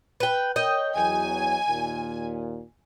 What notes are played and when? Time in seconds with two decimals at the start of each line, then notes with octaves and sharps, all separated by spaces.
0.20 B4 G5
0.56 A#4 C#5 D#5 G5
0.96 E2 F#3 G#5
1.68 D#2 A#2